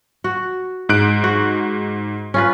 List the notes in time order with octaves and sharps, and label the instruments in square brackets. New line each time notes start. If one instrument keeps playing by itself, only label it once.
[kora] F#4
[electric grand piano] G#2 F#6 D7
[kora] F#4
C#4 F4 B4